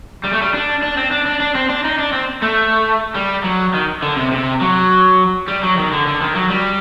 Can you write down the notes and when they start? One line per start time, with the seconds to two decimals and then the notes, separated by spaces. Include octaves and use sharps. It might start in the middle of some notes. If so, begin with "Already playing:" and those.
0.24 G3
0.33 A3
0.41 G3
0.53 D4
0.82 D4
0.97 C4
1.11 D4
1.26 D4
1.40 D4
1.55 C4
1.69 D4
1.84 D#4
1.99 D4
2.13 C4
2.42 A3
3.15 G3
3.44 F#3
3.74 D#3
4.02 D3
4.16 C3
4.32 C3
4.61 F#3
5.48 G3
5.63 F#3
5.77 D#3
5.92 D3
6.07 D3
6.21 D#3
6.35 F#3
6.50 G3